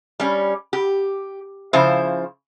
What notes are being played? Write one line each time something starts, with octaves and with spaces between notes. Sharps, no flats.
G3 C#4
G4
C#3 F3 E4 C5